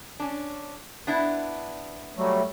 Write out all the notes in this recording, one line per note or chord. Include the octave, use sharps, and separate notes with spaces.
C#4 D4
B3 D4 E4
F#3 G3 A3